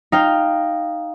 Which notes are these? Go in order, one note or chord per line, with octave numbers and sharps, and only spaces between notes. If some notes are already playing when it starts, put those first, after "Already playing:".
D#4 F5 G5